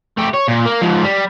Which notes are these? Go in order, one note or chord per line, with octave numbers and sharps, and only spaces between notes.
A3 G4
C#5
A#2
A#3
G#2 F3
G3